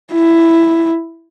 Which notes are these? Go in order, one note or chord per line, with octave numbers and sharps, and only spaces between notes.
E4